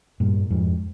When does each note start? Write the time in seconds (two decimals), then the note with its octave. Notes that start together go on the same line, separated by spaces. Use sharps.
0.20 G2 A#2
0.50 F2 G#2